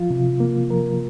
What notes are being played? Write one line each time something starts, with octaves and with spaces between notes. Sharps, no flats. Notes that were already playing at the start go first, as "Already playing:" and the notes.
Already playing: F3 F4
C3
A#3
F3 A#4